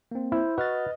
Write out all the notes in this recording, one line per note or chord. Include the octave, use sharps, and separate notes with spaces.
A#3 C4
E4 C5
F#4 B4 D#5 F6 A6